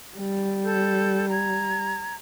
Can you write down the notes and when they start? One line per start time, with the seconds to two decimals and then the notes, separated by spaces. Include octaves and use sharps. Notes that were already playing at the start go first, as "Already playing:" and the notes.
0.18 G3
0.65 A4 G6
1.30 A#5 G#6